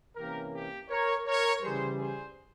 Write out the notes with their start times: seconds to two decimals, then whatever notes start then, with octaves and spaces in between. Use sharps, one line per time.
0.16 C3 E3 A#3 C#4 G4 A#4
0.53 G4
0.89 A#4 C#5
1.26 A#4 C#5
1.62 C#3 E3 G3 G#4 C5
1.98 G#4 C5